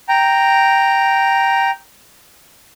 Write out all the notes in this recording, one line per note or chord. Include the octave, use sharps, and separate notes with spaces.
G5 A#5